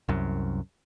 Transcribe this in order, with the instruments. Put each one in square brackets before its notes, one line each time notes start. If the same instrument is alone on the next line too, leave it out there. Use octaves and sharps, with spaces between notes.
[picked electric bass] C2 F#2